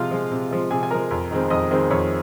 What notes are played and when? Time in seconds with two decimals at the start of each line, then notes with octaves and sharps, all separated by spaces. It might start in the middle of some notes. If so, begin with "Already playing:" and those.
Already playing: C3 F3 G#3 F4 F5
0.11 F3 G#3
0.31 C3
0.51 F3 G#3
0.71 C3 G#4 G#5
0.83 G#5
0.91 F3 G#3 A#4 A#5
1.11 F2
1.31 D#3 G#3 C4
1.50 F2 D#5 D#6
1.71 D#3 G#3 C4
1.90 F2 C#5 C#6